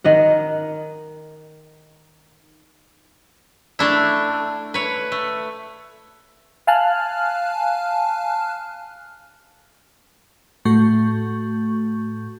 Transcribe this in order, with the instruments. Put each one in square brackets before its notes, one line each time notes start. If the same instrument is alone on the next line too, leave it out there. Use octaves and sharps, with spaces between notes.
[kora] D#3 D#5 F#5
[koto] A3 D4 E4
B4 C#5
A3
[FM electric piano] F5 G#5 A5 F6 F#6
A2 A3 F#4 C#6 G6